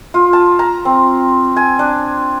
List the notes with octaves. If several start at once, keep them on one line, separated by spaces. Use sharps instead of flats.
F4
A5
A#5
C4
G#5
D4